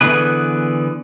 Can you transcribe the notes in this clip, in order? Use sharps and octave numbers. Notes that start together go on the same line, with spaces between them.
D3 E3 B3 G#4 B4